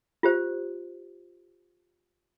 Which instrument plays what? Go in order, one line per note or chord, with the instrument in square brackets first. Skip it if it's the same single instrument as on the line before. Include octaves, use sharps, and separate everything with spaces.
[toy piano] F4 G4 C5